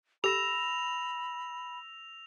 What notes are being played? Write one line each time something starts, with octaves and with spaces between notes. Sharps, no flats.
G4 A4 B5 E6 A#6 E7 F7